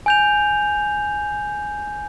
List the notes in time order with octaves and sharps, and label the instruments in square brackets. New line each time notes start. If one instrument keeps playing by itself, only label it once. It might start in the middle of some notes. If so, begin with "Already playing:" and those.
[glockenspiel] G#5 G6 F7